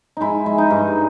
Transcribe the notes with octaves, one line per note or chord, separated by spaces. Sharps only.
G#3 D#4 E4
G#3
D#4
G2